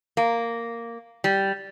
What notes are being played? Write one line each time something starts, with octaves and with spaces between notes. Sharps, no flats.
A#3
G3